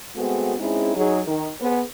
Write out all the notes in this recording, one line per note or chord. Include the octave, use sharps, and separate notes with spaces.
G#3 A3 B3 C4 F#4 G#4
G#3 C4 C#4 D#4 E4 G#4
F#3 D#4 G#4
D#3
B3 G#4 C5